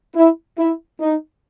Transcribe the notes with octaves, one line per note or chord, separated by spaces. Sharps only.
E4
E4
D#4